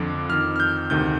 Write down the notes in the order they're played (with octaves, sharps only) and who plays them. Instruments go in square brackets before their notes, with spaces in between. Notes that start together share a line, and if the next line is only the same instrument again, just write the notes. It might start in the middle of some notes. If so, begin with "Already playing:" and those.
Already playing: [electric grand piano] F2 D3 F3 D6
F2 D#3 F6
F6
G6
D2 C3 D#3 G6